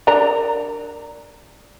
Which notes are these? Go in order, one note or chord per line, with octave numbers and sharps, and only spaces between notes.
D4 A#4 A#5